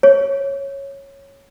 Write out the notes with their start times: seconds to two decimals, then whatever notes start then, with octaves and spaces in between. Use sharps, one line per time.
0.03 C#5